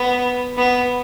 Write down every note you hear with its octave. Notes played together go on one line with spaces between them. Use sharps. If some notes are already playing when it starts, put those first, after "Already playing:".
Already playing: B3
B3